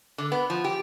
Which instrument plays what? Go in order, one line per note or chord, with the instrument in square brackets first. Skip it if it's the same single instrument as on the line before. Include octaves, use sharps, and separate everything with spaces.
[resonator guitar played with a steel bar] D3
B3
F3
G4